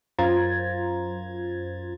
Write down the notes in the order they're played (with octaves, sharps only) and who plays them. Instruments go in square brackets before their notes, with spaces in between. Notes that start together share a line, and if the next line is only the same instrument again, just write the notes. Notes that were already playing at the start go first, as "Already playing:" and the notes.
[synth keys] F#2 F4 C5 A#5 G#6 A6